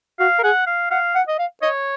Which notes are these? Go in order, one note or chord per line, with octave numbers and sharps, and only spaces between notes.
F#4 F5
A#4
G#4 F#5
F5
F5 F#5
F#5
D#5
F5
C#5 D#5